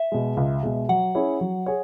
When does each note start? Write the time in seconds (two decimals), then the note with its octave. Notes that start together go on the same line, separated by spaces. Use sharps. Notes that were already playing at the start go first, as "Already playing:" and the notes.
Already playing: E5
0.12 B2 G#3
0.37 C#2
0.63 B2 G#3
0.89 F#3 F#5
1.15 C#4 E4 G#4 C#5
1.41 F#3
1.66 G#4 C#5